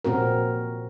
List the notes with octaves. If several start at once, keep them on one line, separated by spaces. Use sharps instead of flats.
A#2 C4 F#4 A#4